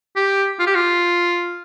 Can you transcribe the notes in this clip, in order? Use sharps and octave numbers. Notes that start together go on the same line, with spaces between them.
G4
F4
G4
F4